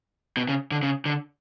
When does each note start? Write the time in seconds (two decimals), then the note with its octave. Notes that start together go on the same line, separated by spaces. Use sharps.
0.37 B2
0.48 C#3
0.71 D3
0.83 C#3
1.05 D3